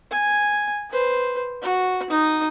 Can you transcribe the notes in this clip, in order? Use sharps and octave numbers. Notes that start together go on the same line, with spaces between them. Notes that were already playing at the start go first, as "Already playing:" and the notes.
G#5
B4 C5
F#4
D#4 D#6